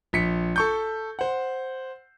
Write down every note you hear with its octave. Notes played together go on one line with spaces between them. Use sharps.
A#1 B6 C#7
A4 C#6 G6
C5 F#5